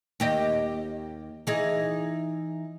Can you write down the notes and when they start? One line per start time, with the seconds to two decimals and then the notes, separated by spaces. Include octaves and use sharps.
0.20 D#2 G4 D#5
1.47 E3 D#4 G#4